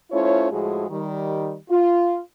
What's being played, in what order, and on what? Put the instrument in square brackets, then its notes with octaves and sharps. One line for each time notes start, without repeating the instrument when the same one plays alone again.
[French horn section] A3 C#4 E4 F4 C5 C#5
A2 F3 G#3 F#4 G#4
D#3 G3
F4